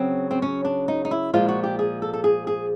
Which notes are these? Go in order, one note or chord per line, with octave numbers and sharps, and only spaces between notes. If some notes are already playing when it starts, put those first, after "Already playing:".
Already playing: C#3 F#3 C4
C4
C#4
D4
D#4
D#4
E4
A#2 F3 G#3 F4
F#4
G4
G#4
A4
A4
G#4
G#4